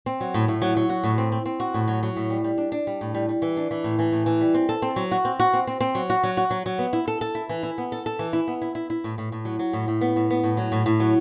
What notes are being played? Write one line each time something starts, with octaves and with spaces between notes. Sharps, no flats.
C4
F#3
A2
A2
F#3
F#3
F#4
A2
C4
C4
C4
F#4
A2
F#3
F#3
A2
G3
G3
D4
D4
G3
A2
G3
G3
E3
D4
E3
A2
E3
A2
E3
G3
C4
A4
C4
F#3
F#4
C4
F#4
C4
C4
C4
F#3
F#4
F#3
F#4
F#3
F#3
B3
E4
A4
A4
E4
E3
E4
B3
A4
A4
E3
E4
B3
E4
E4
E4
A2
A2
A2
F#3
F#3
A2
A2
B3
A2
B3
A2
F#3
A2
A2
F#3